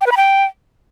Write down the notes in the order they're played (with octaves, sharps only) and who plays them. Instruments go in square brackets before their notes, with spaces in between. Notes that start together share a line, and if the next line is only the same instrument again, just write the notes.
[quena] G5
B4
B5
G5